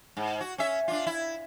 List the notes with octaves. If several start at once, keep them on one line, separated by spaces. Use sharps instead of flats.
G#2
F#4
C#4 E5
D4 F4
E4